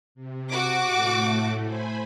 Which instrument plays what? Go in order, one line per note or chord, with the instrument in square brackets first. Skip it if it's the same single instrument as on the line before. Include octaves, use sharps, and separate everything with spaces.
[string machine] C3
[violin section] F#4 D6
[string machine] A2 A3
C5 G#5 B5